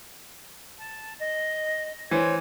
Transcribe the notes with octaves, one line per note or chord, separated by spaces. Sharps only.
A5
D#5
E3 C5 C#5 G#6